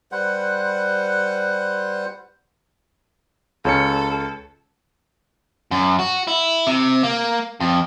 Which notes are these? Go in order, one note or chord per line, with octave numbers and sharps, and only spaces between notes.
G3 B4 C5 F#5
C#2 C#4 A4 C#7
F#2
F#4
E4
C3
A#3
F2